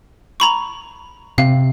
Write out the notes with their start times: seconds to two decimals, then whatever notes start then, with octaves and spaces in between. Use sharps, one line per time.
0.40 A#5 B5 C#6
1.38 C3 F5